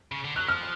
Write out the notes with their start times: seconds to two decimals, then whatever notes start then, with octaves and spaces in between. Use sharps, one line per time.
0.12 C#3
0.24 D3
0.36 F#3 F#6
0.48 F3 F6